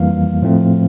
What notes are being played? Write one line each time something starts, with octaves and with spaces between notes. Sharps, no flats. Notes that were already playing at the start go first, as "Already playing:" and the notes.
Already playing: F2 E3 G3 A#3 F5
A2 F3 A3 C4